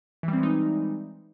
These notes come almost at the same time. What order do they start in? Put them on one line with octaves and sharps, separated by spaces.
E3 G3 C4 G#3 D#4